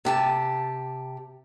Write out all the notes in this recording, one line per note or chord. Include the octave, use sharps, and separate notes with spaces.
C3 G4 A5